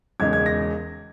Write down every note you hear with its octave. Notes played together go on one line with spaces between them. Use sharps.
E1 E2 C#3 G#3 D#4 G#6
G#6
A#6